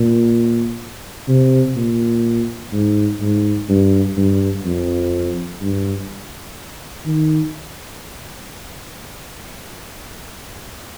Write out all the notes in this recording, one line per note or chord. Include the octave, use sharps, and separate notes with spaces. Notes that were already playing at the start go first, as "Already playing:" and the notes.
Already playing: A#2
C3
A#2
G#2
G#2
G2
G2
F2
G2
D#3